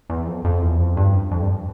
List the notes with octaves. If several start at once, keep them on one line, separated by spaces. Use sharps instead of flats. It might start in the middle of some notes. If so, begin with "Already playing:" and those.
E2
F2
F2
E2
F2
G2
F2
G2